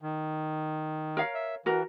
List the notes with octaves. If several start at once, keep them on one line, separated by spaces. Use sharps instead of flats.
D#3
A#4 C#5 F5
E5
E3 F#4 A#4